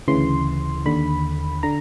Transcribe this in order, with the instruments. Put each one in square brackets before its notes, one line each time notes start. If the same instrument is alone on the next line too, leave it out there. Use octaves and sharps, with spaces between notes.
[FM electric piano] D2 C#3 E3 C6
D#2 D3 B5
D3 A#5